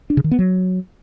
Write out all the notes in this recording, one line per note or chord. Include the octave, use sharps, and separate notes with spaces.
D4
C#3
D#3
B3
F#3